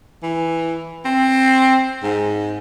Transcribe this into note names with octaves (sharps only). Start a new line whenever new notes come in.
E3
C4
G#2